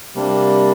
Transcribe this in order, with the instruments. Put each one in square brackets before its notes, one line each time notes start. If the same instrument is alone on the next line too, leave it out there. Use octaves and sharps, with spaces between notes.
[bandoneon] C3 G3 A#3 D4